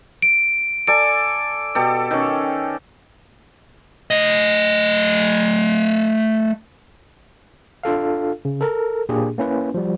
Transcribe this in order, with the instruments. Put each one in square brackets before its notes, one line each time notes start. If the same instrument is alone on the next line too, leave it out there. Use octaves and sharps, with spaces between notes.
[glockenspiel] D7
[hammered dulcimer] A4 D5 G#5 [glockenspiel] D7
[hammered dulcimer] B2 G4 A4
D#3 C#4
[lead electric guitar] A3 D#5
[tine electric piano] D4 F4 A4 F5
C#3
A4 A#4
A#2 A#3 D4 G4 G#4
A#3 C#4 E4 B4
F3 G3